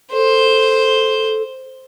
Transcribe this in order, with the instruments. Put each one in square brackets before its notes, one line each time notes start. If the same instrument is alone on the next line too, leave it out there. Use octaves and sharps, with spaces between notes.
[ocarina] A4 [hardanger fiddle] C5